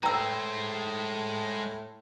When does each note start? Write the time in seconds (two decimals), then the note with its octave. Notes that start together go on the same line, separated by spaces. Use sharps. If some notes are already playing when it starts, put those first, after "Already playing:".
0.03 A2 G#3 B4 C5 G5 A#5 E6